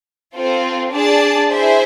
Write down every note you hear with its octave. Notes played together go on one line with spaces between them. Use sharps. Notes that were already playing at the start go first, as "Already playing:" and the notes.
C4 F4 A4 C5
D4 G#4 D5 A5
E4 G#4 C5 E5